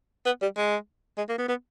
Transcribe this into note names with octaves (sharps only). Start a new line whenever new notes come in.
B3
G3
G#3
G#3
A#3
B3
B3